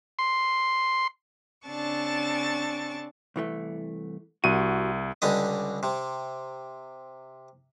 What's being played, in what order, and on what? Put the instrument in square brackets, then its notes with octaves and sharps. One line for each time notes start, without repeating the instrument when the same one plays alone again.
[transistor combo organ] C6
[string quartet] C#3 C4 D4 A5 C#6 A6
[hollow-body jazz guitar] C2 E3 A3
[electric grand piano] C2 D#7 [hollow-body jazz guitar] F#4
[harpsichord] C#2 D3 G3 D#5
C3